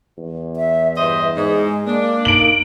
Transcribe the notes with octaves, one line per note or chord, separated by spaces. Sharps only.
E2
E5
G2 C5 D#5 E5
G#2 G#3
A#3 D4
D#4 D7 F#7